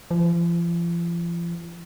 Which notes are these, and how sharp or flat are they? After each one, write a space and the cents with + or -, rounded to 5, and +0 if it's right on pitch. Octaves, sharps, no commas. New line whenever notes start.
F3 -40